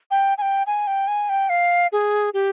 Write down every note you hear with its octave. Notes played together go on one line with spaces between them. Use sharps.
G5
G#5
G5
G#5
G5
G#5
G5
F5
G#4
G4